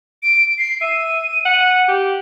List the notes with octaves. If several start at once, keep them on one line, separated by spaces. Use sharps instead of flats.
D7
C7
E5 D#7
F#5
G4